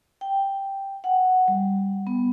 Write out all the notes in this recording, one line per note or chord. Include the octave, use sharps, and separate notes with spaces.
G5
F#5
G3
B3